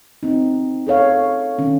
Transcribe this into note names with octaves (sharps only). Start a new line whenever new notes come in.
C4 D#4
G#4 A4 C#5 F5
D#3 C#4